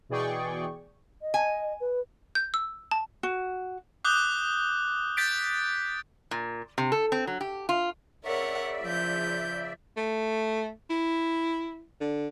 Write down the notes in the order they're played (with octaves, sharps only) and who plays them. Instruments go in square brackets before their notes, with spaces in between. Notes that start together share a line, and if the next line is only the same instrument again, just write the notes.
[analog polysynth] B2 E3 G#4 D5 G5 C#6
[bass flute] D#5
[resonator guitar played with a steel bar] G#5
[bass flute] B4
[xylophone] G6
E6
A5
[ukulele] F#4
[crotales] D6 D#6 F#6 G6 G7
G6 A6 B6 D7
[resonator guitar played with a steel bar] A#2
C3
A4
C4
F#3
G4
F4
[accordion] C#3 D5 E5 [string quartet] A#4 C#5 F#5
[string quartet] F3 G6
[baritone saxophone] A3
E4
D3